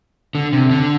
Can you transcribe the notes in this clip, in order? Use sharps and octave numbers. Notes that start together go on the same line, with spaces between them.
D3
C3
D3